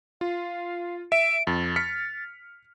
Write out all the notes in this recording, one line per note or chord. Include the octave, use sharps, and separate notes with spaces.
F4 F5
E5 D7
F2 A6
F6 B6 C#7